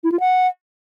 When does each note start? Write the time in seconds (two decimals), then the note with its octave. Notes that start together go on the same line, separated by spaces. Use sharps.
0.04 E4
0.12 F4
0.20 F#5